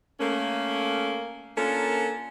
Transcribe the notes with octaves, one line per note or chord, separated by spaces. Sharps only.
A3 A#3 C#4
A#3 C#4 D4 F4 A4 A#4